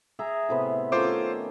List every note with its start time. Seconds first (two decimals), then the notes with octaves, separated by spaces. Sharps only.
0.19 G#4 E5 A#5
0.49 A2 C3 B3
0.92 D#3 A3 C#4 F4 C5 D6